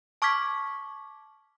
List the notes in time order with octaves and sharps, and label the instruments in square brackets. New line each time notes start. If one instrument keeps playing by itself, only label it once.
[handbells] A5 C#6 D6 F6 G#6 B6